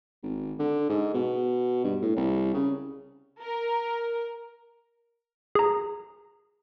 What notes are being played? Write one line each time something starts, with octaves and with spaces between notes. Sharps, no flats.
G#1
D3
G#2
B2
G2
A2
C2
C#3
A#4
G#4 A#5